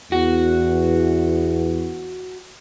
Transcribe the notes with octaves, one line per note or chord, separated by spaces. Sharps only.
E2 F#4